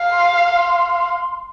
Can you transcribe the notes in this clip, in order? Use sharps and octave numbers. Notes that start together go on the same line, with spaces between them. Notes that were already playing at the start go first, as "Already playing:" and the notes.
Already playing: F5
C6